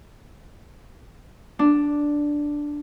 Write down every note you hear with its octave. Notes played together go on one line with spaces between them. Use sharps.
D4